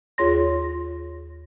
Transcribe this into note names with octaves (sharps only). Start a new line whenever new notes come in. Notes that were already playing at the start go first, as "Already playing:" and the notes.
D#2 F4 G#4 C#5 C6 A#6